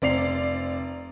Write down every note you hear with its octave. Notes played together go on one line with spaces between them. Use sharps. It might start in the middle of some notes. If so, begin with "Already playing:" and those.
F1 C4 D5 C7 F7